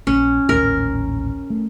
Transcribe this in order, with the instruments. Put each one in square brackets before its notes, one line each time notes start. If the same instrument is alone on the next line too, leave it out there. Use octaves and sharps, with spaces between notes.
[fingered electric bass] A#1 [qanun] C#4
[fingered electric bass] A1 D#2 A#2 [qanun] A#4
[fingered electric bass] A3